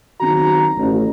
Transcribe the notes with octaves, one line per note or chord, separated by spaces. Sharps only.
F#1 D#3 C4 F#4 A#5
A1